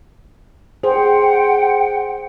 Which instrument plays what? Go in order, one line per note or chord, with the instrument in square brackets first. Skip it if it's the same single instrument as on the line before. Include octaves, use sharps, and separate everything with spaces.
[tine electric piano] G#4 [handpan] C5 [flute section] F#5 G5